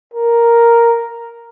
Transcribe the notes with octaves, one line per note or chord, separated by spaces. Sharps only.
A#4